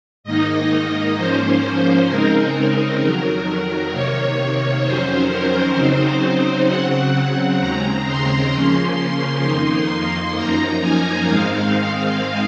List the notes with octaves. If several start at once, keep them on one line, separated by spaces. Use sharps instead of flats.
G#2 D#3 A#3 D#4 D#5
G#2 F3 A#3 C#4 C5
C5
C#3 G#3 C4 D#4 A#4
A#4
F2 D#3 F#3 A#4
C3 D#3 A#3 C#5
F2 D#3 F#3 C#4 C5
A#4
C#3 F#3 C4 D#4 C5
C#3 F#3 C4 F#5
F#5
D#2 C#3 G#3 C4 A#5
C6
C#3 F3 A#3 C#4
F2 D#3 A#3 D#4 C6
C6
F#2 F3 A#3 D#4 A#5
G#5
G#2 D#3 G#3 C4 D#4 F5